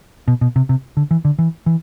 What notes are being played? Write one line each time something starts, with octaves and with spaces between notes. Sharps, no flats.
B2
B2
C3
C3
D3
E3
D3
E3
E3